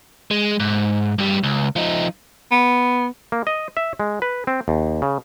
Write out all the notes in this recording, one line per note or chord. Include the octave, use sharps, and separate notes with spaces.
G#3
G#2
G2 G3
C#2
F3 D#4
B3
A#3
D#5
E5
G#3
B4
C4
D#2
C#3